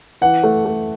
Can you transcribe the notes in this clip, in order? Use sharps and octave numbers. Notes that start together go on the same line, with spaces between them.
E3 F#5
A3
A3